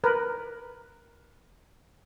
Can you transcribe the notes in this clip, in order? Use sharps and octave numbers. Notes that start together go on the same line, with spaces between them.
A#4 B4